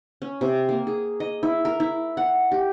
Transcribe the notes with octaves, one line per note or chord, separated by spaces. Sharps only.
C#4
C3
A#3
G#4
D#5
E4
A#4
E4
F#5
G4